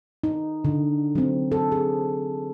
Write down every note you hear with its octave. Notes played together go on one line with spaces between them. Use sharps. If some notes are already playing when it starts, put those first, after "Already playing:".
D#4
D3
F#3 C4
A4
G#4